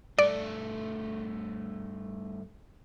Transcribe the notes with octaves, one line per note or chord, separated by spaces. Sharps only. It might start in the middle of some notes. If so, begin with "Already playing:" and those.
G2 A3 D5